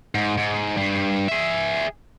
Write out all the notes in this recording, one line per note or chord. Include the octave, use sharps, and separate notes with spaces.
G#2
G#2
G2
G#4 E5